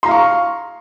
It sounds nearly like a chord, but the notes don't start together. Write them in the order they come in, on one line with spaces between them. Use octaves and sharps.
C6 A#5 F5 C#6